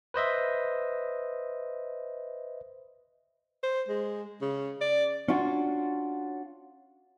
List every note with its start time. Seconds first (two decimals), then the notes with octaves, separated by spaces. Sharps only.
0.14 B4 C5 D#5 E5
3.63 C5
3.88 G#3
4.41 C#3
4.81 D5
5.28 C#4 D4 F4 F#4